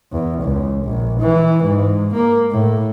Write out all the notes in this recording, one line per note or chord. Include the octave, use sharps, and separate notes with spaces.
E2
C#2
A#1
E3
G#2
A#3
A2